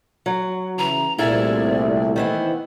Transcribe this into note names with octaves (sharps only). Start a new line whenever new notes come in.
F#3
C#3 E3 A#5
C2 A#2 A3 E4 G#4 D5
D#3 E3 B3 C5